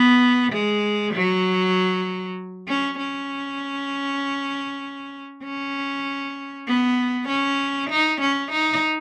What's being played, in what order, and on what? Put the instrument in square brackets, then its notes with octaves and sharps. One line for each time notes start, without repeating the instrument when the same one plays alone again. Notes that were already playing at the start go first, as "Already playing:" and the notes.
Already playing: [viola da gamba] B3
G#3
F#3
C#4
C#4
C#4
B3
C#4
D#4
C#4
D#4